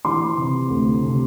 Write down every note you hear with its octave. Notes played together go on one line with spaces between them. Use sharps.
E3 C6 D6
C3
D2
C3